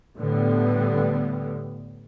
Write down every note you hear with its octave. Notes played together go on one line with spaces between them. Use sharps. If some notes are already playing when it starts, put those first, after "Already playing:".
A2 D3 G3 B3